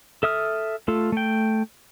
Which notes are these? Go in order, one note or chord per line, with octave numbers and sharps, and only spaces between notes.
A4 E5 D#6 F6
A3 F4 A4
A3 G5